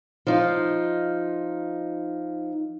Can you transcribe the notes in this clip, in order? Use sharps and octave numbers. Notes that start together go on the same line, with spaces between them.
F3 D#4 F4